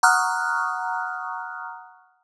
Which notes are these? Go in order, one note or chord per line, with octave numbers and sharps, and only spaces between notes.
F#5 A#5 C#6 D#6 F6 F#6